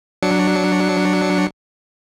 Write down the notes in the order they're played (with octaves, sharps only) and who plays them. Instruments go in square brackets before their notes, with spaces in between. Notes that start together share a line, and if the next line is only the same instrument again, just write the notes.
[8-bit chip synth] F#3 D4 C#7